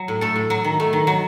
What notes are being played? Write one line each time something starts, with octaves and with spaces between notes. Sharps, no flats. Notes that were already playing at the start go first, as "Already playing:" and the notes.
Already playing: F#3
A2
A3 A4
A2
F#3
D#3
A3
D#3
F#3